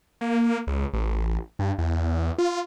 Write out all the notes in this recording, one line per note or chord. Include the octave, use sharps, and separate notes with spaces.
A#3
C#2
A1
G2
E2
F4